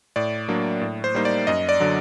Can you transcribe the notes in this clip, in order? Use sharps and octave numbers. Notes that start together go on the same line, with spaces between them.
A2 D5
F#3 A#3 D4
A2
C5
G3 A#3 D#4 C5
D5
F#2 D#5
D5
D3 F#3